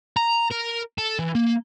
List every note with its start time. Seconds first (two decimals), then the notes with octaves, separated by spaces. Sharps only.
0.17 A#5
0.51 A#4
0.98 A4
1.19 E3
1.35 A#3